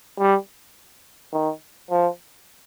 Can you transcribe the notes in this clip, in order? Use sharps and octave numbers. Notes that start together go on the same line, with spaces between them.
G3
D#3
F3